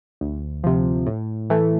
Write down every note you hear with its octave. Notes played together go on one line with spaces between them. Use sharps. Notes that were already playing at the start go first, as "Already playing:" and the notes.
D2
C3 F3
A2
E3 A3